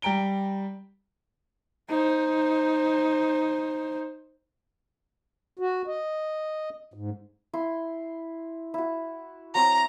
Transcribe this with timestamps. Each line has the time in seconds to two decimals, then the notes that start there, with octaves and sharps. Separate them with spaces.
0.02 G3 G5 A#5 D7 G7
1.89 D#4 C5
5.59 F#4
5.87 D#5
6.94 G#2
7.53 E4 C6
8.74 E4 F#4
9.55 F#3 C4 A#5